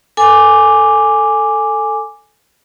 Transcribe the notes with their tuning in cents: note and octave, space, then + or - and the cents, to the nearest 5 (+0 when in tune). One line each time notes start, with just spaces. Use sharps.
A4 +10 G#5 +0 D6 +0